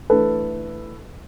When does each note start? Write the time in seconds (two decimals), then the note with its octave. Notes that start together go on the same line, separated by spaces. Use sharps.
0.10 E3 A3 D4 A4 B4